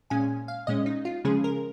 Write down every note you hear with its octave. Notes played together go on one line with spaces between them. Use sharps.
A#2 G#3 C#4 G#5
F5
A#2 G#3 C#4 D#5
D#4
F4
C#3 F3 G#3 C#4 G#4
A#4